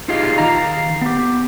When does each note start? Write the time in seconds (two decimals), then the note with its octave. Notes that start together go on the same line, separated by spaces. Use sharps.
0.08 D#4 F4 G4 G#4 D#5 F5
0.38 D#3 F5 A#5
1.01 B3 G4